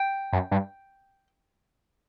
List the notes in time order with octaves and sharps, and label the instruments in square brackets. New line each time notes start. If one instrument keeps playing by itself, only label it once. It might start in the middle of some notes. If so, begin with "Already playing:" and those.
Already playing: [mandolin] G5
[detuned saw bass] F#2
G2